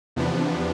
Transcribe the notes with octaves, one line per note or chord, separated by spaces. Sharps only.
E2 C3 F3 B3 D4